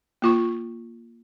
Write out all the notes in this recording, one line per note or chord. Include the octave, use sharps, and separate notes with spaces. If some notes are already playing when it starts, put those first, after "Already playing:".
A#3 F4 C#6